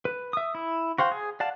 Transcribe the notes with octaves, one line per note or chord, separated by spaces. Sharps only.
B4
E5 D#6
E4
F#4 C5 F5 G5
G#4
D5 F5 F#5 A5